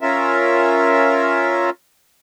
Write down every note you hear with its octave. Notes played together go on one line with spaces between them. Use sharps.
C#4 F4 A#4 E5